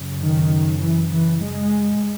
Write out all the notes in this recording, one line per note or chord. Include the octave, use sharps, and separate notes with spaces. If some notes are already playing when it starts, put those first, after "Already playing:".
Already playing: F#2 C#3
D#3
E3
E3
G#3